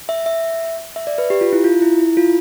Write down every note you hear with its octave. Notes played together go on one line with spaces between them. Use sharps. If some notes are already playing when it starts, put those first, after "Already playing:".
E5
E5
E5
D5
B4
G4
F4
E4
F4
E4
E4
F4